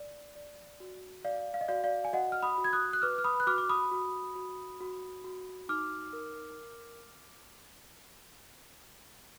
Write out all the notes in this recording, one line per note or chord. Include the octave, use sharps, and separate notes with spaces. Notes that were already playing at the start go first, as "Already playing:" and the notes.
Already playing: D5
D5
F#4
D5 F5
F5
D#5
F#4 D5 F5
D5 F5
G#5
F#4 D#5 F#5
F6
B5 D#6
F#4
G#6
D#6 F#6
F#6
B4 D6 F6
F6
B5 D#6
F#6
F#4 D6 F6
D6
B5 D#6
F#4
F#4
F#4
F#4
D#4 D6 F6
A#4